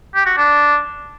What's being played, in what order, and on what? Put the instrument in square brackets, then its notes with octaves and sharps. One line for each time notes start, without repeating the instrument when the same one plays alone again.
[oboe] G4
F#4
D4